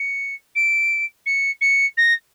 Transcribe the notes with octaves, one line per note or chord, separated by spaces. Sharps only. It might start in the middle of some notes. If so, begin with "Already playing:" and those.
Already playing: C#7
D7
C#7
C#7
A#6